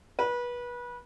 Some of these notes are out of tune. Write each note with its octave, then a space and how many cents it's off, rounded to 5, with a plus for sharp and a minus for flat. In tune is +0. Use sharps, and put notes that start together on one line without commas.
B4 -25